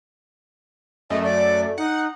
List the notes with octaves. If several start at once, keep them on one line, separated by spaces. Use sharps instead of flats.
F#2 A3 D#5
D5
D#4 F#5